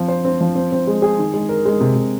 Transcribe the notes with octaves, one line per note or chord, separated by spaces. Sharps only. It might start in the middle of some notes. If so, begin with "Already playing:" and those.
Already playing: F3 C4
C5
C4
F3
C4
C4
G#3
G#4
D#3
G#3
A#4
G#3
C3
C3